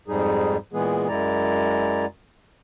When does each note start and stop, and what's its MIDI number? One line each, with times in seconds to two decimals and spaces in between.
0.08 0.57 41
0.08 0.57 44
0.08 0.57 55
0.08 0.57 63
0.08 0.57 68
0.73 1.08 46
0.73 1.08 52
0.73 1.08 56
0.73 1.08 59
0.73 1.08 68
1.08 2.06 42
1.08 2.06 56
1.08 2.06 64
1.08 2.06 74
1.08 2.06 82